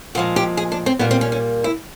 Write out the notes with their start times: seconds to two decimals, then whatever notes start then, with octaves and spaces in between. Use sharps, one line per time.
0.15 A#2 F3 G#3 F#4
0.36 G4
0.57 G#4
0.72 D4
0.86 C4
0.99 A#2 G3 A#3 B3
1.11 C4
1.21 C#4
1.32 C#4
1.64 E4